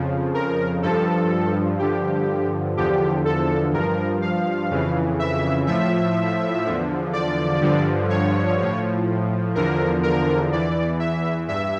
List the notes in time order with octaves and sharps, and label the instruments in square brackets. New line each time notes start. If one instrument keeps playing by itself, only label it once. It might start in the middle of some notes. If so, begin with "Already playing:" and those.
Already playing: [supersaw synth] F2 C#3 F3
A#4
G2 F3 A4
G2 D3 F3 G4
E2 D3 F3 G4
A4
G2 F3 A#4
F5
F2 C#3 E3
E5
A2 F3 E5
E2 D3 F3
D5
G2 D3 F3
C#5
A2 F3
E2 D3 F3 A#4
A#4
E2 E3 D5
E5
G2 E5